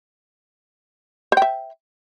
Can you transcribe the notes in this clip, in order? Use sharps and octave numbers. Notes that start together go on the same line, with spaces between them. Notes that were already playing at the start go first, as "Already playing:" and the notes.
C5 E5 G5